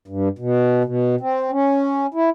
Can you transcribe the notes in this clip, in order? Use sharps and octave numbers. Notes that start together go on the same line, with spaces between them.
G2
B2
B2
C4
C#4
E4